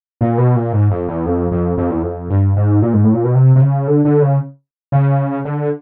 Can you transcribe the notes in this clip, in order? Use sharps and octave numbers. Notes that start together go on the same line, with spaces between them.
A#2
B2
A#2
G#2
F2
E2
F2
F2
F2
E2
F2
G2
G#2
A#2
G#2
A2
A#2
B2
C3
C3
C#3
D3
D3
C#3
C#3
D3